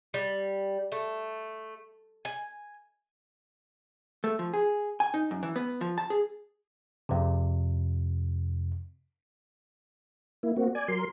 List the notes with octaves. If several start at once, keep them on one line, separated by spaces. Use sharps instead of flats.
G3
A3
G#5
A3
F3
G#4
G#5
D#4
F#2
E3
B3
F3
A5
G#4
F2 C3
A#3 E4
A#3 C4 F#4
D5 G#5
F#3 A#4 C6